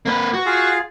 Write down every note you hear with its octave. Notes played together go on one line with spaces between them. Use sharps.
A#3 B4
F#4
F4 G#4 F5